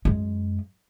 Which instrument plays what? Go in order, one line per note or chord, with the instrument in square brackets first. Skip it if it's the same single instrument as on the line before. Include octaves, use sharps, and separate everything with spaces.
[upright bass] F#2 G#3